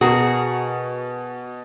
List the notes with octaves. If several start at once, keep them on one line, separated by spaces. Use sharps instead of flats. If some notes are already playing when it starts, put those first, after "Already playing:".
B2 F#4 G#4 A#4